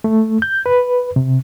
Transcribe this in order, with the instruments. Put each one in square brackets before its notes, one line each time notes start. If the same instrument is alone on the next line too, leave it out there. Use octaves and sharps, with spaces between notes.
[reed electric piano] A3
G6
B4
C3